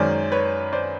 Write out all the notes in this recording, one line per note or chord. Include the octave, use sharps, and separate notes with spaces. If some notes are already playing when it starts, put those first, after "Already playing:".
Already playing: F#2 D#3 G#3 C#4 C5 D5
B4 C#5
C5 D5